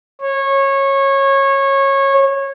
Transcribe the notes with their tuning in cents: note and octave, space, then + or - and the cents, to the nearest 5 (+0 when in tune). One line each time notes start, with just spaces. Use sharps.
C#5 -20